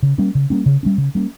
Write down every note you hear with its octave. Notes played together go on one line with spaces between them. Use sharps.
C#3
G3 A#3 C#4
C#3
G3 A#3 C#4
C#3
G3 A#3 C#4
C#3
G3 A#3 C#4